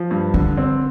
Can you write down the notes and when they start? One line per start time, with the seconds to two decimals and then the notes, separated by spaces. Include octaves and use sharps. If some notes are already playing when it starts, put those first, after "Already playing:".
Already playing: F3
0.11 G2
0.34 D3 D4
0.58 C4